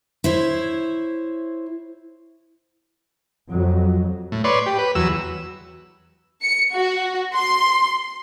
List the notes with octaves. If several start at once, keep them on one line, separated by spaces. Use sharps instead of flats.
E4 C5 C#5
F2 F#3
A2
B4 C#5 D5 C6
G4
B4
E2 F#3 E6
C#7
F#4
C6